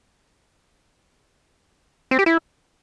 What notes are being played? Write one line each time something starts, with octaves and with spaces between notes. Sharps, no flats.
C4
G4
E4